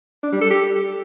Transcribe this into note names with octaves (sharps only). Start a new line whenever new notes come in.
D4
G3
A4
G4